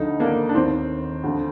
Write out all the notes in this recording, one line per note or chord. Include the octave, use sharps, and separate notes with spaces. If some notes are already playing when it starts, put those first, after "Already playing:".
Already playing: D2 D3 F3 D#4
A#3 D4
D4
D#2 D#3 C4
D2 D3 F3